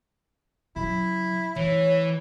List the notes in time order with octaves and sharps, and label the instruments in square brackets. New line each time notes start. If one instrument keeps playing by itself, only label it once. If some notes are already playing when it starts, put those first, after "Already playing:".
[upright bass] C#3 F#3 [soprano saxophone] E4
[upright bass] C#3 A3 [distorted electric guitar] E3 [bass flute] C#5